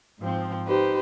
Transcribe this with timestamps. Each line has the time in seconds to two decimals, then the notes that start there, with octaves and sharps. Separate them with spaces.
0.20 G#2 F3 C4
0.67 D#4 G4 B4 C5